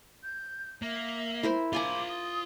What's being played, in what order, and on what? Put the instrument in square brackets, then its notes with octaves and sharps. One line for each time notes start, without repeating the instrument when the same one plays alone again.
[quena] G6
[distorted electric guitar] A#3 [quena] E5
[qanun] E4 A#4 C5
[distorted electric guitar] F4 B5 [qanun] F5 G#5 A#5 [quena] D6
[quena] D#6